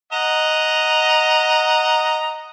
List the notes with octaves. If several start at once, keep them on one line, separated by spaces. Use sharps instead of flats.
D#5 F#5 A#5